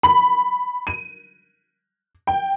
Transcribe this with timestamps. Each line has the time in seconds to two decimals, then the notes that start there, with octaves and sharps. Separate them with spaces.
0.03 B5
0.87 D#7
2.27 G5